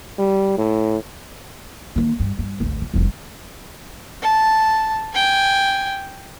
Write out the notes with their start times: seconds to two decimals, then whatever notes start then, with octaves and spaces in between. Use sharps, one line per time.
0.19 G3
0.58 A2
1.96 D#3 A#3
2.20 G2
2.39 G2
2.60 G#1 D2
2.82 E3
2.94 F1 C2
4.22 A5
5.14 G5 G#5